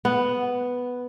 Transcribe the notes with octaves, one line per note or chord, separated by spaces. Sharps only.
B3